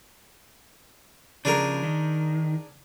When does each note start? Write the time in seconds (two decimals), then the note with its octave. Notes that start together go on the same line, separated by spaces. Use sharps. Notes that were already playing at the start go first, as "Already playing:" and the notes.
1.45 C#3 F3 D4 G#4 A#4
1.83 D#3